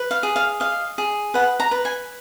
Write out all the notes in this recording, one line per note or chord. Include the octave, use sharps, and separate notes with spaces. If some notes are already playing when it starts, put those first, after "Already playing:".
Already playing: B4
F5
G#4
F5
D#5 F5
G#4
B4 F#5
A#5
B4
G#5